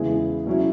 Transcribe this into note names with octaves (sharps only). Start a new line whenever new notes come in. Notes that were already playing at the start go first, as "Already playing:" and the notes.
Already playing: E2 C#3 G#3 B3 E4
B2 F#3 C#4 E4